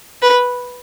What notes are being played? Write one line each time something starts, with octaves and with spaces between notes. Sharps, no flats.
B4